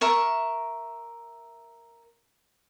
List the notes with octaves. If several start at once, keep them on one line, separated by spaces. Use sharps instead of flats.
A#4 E5 C#6